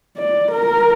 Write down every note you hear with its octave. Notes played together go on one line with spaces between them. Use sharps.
D5
A#4